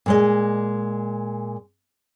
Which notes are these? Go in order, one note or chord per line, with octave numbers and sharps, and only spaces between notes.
A#2 G#3 D#5